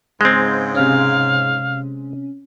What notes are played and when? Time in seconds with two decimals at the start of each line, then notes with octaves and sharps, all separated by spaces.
0.21 G#2 C#3 G#3 C4 G6
0.75 C3 C#4 F5